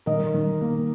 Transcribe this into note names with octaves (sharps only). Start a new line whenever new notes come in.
D#3 A#4 D#5
D#3
A#3